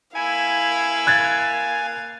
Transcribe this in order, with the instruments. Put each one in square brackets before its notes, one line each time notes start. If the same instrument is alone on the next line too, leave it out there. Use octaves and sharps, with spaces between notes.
[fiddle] A#3 F5 [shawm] E4 [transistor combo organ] G#5
[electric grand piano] F#6 G#6 A6